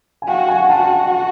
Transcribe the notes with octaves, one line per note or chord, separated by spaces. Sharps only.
G#5
F#4 F5 G5
F#5 G#5
F#4 G5 A5